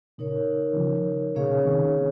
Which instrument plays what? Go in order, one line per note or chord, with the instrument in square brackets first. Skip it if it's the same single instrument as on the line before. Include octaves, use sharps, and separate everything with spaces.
[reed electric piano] A#2 C#3 [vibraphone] D#4 A#4 C#5
[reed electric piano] D#3
C#3 F3
[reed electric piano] A#2 C#3 [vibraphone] A#3 C#4 G#4 C#5 F5
[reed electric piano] A#2 C#3
C3 D#3